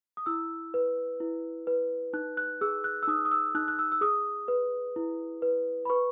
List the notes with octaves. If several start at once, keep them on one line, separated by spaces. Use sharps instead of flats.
D#6
E4 E6
B4
E4
B4
D#4 F#6
F#6
G#4 E6
F#6
E6
D#4 D#6
D#6
E6
D#4 F#6
F#6
E6
E6
G#4 D#6
B4
E4
B4
B5
B4 C#6